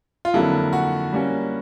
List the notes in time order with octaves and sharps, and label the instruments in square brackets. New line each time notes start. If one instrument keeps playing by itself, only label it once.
[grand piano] F4
[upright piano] F2 D3 F#3 A#3 [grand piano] E4
[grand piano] F#4
[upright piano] G3 A#3 C#4